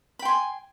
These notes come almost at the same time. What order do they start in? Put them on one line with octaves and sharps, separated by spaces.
B5 G5 C6 G#5